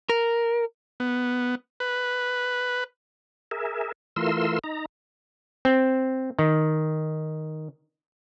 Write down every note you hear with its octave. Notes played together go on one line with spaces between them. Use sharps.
A#4
B3
B4
G#4 A#4 E5
E3 A3 F4 A#4 C6 E6
D#4 A#5
C4
D#3